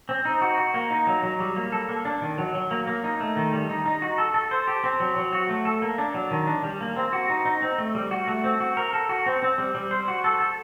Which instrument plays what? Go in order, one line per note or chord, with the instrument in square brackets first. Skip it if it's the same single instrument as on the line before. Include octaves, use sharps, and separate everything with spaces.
[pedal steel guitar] C4
D#4
F#4
F#4
A#3
D#4
F#3
F#3
G3
A#3
A4
A#3
D4
D#3
F#3
F#3
A#3
A#3
D#4
A3
D#3
G3
D#4
D#4
F#4
A4
A4
C5
G4
C4
F#3
F#3
F#4
A3
A4
A#3
D4
F#3
D#3
D4
G3
A#3
C4
F#4
D#4
D#4
C4
A3
G3
F#4
A3
C4
F#4
A#4
A4
F#4
C4
C4
G3
G3
C5
F#4
A4
A4